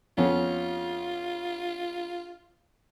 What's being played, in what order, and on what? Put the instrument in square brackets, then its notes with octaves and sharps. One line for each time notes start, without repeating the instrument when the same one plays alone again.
[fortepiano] F2 B3 C#4 [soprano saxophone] F4